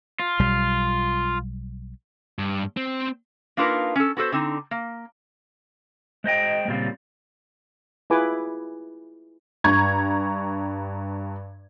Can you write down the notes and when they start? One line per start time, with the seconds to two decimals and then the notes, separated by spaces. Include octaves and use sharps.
0.20 F4
0.39 B1 G3
2.39 G2
2.77 C4
3.57 A#3 D4 D#4 F4 A#4 B4
3.96 C#4 A4
4.17 B3 F#4 A4 B4 C5
4.32 D3 C4 D#4
4.71 A#3
6.24 G#3 C5 D#5 G5
6.68 A#2 C#3 G3 C4 F4
8.10 E4 F4 G#4 B4 G#5 D6
9.64 G2 A#5 C#6 G#6